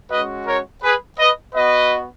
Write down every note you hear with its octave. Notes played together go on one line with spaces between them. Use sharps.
G#3 C#4 F#4 B4 D#5
A#4 C#5
G#4 B4
B4 D#5
B3 F#4 B4 D#5